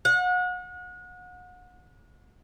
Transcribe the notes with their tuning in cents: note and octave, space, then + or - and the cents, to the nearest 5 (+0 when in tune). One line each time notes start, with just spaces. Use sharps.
F#5 -35